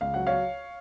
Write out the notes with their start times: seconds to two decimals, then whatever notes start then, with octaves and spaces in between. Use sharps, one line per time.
0.01 C#2 F5
0.14 F#3 F#5
0.27 F#3 C#5 F5